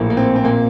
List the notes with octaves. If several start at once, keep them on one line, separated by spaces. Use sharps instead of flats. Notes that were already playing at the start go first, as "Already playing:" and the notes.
Already playing: A#1 A2 A#3
A#3
C4
C4
A#2 A#3